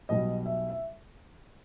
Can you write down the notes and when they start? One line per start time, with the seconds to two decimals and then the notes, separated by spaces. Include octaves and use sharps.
0.09 B1 B2 G3 D#5
0.46 E5
0.70 E5